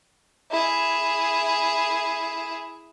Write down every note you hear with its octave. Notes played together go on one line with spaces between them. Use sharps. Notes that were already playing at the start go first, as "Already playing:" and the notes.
E4 G#4